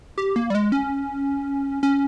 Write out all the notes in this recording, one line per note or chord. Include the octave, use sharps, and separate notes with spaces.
G4
A#3
G3
G#3
C#4
C#4